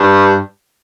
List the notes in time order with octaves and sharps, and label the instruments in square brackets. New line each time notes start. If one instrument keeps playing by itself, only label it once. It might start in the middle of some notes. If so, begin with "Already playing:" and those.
Already playing: [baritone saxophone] G2